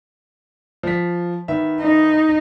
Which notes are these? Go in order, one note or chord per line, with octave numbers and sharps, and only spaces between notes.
F3 B6
D#3 B3 E5
D#4